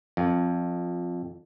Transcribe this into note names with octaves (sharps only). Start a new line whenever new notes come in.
F2